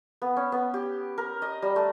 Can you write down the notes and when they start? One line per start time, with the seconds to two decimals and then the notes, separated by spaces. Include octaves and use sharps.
0.22 B3
0.37 C#4
0.52 B3
0.74 G4
1.18 A#4
1.42 D#5
1.62 G3
1.76 A3